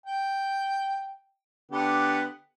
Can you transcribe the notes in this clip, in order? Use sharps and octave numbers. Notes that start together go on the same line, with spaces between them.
G5
D3 B3 G4